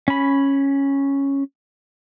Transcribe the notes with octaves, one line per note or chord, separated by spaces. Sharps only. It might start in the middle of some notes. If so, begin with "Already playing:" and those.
C#4 B5